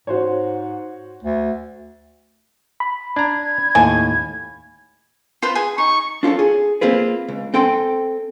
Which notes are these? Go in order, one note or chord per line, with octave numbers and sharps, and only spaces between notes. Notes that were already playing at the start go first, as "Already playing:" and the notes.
G#2 F#4 C5 C#5
D2
B5
D4 A#5 G#6
D#2 A2 G#5 A5
F4 B4 C5
G#4 G#5
D#4 C#6
D4 F4 G4 A4 C#5
G#4
A#3 C4 F4 G#4 B4
C#2
C4 A4 G5 G#5 C6